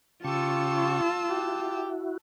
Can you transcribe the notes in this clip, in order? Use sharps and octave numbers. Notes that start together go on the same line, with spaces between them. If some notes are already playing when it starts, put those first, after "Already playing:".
C#3 F4 G4 A5 C#6 E6
E4 F#4 G4